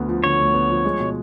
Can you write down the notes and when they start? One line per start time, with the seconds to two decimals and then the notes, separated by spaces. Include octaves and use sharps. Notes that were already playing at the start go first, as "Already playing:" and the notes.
Already playing: D2 D3 B3
0.09 F3
0.24 D3 C#5
0.39 D2
0.54 B3
0.70 F3
0.85 G#3
1.00 B2